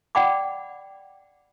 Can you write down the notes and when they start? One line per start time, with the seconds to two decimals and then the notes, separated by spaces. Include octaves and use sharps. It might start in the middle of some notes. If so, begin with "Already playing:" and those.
0.15 D5 F#5 G5 B5 D6